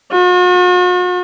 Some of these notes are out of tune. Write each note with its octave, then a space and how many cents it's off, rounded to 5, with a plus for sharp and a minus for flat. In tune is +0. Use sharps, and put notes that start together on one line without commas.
F#4 -45